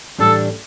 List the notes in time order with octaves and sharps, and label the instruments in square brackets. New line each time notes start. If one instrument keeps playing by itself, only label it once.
[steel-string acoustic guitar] A2 E3 G3 D4 [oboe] A4